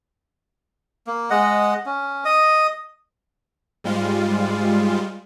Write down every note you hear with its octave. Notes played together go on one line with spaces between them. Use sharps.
A#3
G#3 D#5 F#5
C#4
D#5 D#6
G#2 G3 G#3 F4